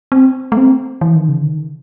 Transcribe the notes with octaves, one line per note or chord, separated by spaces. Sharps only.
C4
A3
C4
E3
D#3
C#3
D#3